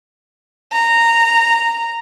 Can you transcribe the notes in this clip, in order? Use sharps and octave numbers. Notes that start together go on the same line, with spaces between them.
A#5